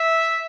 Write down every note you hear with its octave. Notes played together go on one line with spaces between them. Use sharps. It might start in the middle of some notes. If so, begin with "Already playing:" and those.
Already playing: E5